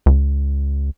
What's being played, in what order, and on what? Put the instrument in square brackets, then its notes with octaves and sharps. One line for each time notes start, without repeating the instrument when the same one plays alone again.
[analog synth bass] C#2